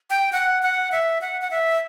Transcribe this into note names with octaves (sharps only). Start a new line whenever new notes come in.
G5
F#5
F#5
E5
F#5
F#5
E5